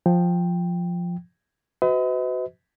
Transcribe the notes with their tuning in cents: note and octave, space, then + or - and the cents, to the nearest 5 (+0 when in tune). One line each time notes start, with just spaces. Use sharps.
F3 +5 G5 +0
F#4 +5 B4 +40 D#5 +40